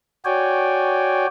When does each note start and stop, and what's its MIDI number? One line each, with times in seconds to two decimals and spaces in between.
0.25 1.27 66
0.25 1.27 73
0.25 1.27 74
0.25 1.27 79
0.25 1.27 80